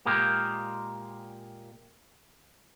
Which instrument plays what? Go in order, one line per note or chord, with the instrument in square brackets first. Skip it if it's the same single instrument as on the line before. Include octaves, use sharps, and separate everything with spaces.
[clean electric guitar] A#2 G#3 A#3 G4